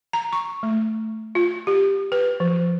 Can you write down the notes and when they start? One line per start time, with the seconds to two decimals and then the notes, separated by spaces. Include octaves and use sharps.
0.13 A#5
0.33 C#6
0.63 A3
1.35 F4
1.67 G4
2.12 B4
2.40 F3